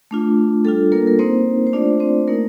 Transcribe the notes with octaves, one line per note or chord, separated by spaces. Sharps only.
A3 D4 F4
G3 D4 F4 A4
A#3 A#4
A#4
A#3 C4 D#4 C5
C5
A3 D4 F4 D5
C4 C5
A3 A#3 D#4 A#4